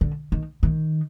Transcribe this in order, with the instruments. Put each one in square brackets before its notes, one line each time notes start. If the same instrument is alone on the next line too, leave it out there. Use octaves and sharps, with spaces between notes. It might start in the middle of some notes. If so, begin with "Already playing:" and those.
[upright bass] D3
D#3
D#3